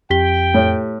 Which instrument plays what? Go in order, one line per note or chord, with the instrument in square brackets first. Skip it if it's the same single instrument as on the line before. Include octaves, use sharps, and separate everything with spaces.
[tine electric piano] F2 [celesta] G4 B6 G7 [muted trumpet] G5
[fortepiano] A2